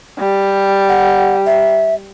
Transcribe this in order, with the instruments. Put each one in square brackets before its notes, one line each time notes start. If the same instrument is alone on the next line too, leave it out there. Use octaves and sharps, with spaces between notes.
[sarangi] G3
[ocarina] F#5
E5